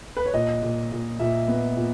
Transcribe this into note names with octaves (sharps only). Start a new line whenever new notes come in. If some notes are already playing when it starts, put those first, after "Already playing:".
B4
C#5
A#2 D#5
A#2
A#2
A#2 E5
B3
A#2